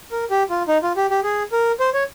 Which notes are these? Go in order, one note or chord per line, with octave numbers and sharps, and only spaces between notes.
A#4
G4
F4
D#4
F4
G4
G4
G#4
A#4
C5
C#5